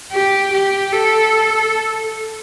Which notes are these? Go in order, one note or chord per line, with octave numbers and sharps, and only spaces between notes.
G4
G4
A4